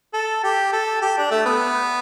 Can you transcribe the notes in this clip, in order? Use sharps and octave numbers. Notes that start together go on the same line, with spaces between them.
A4
G4
A4
G4
D4
A3
B3